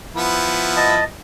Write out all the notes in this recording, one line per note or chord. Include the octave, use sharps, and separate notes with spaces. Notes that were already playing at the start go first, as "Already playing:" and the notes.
F3 B3 E4
D#5 A5